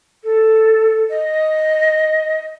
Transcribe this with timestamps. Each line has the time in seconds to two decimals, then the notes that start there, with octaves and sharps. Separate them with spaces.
0.24 A4
1.09 D#5